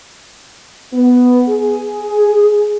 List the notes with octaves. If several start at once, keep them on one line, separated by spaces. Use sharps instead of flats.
B3
G#4